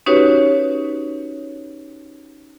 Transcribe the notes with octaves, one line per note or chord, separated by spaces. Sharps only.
C#4 D#4 F#4 G4 B4 C#5